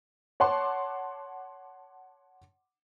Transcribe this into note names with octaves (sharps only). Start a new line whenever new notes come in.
C#5 F#5 A5 C6 D6